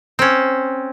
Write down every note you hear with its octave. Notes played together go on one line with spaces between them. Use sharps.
C4 C#4